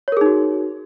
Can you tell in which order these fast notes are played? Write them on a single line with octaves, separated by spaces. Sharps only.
C#5 A#4 G#4 D#4 F#4